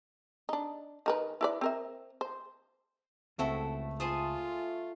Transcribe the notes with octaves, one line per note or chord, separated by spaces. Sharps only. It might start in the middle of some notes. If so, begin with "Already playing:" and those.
D4 D#4
D#3 A#4 B4
E4 B4 D5
C4 A#4 E5
C5
C#2 A3 C4 E4 F#4 A4
F4 G#4 C5 A5 D#6